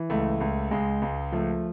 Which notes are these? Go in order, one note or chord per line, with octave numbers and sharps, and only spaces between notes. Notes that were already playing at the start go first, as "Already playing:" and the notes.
Already playing: E3
C#2 A3
C#2
C#2 G#3
C#2
F3 A3